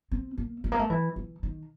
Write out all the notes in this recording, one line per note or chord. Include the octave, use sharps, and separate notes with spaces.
C4
A#3
A3
A#3
A3
E3
E3
D#3